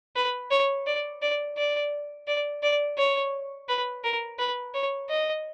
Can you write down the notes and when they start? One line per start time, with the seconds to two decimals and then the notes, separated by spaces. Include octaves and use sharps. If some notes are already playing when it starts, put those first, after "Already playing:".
0.16 B4
0.51 C#5
0.87 D5
1.22 D5
1.57 D5
2.27 D5
2.63 D5
2.98 C#5
3.69 B4
4.04 A#4
4.39 B4
4.74 C#5
5.10 D#5